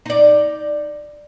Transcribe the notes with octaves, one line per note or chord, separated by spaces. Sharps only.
D#4 D5